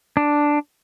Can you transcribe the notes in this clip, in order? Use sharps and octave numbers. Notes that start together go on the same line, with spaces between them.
D4